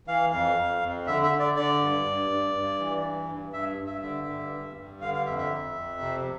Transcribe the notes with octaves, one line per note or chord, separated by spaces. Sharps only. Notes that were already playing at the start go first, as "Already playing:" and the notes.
E3 F5
F2 F5
F2
F2
D3 E5
E5
D3
D5
D3 D5
G2
G2
G2
G2
E3
G2
G2
G2 E5
G2
E5
D3 E5
G2
G2
G2
D3 F5
F5
F2 E5
E5
F2
F2
C3